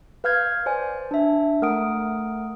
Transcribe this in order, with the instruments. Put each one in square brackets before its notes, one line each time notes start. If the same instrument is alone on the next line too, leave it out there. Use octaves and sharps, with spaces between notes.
[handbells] B4 F5 F6 G6 G#6
C5 D5 G#5
D4 E5
A3 A#4 F#5 D#6 D7